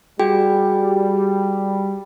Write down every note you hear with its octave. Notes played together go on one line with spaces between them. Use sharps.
G3 F#4 G#4 G5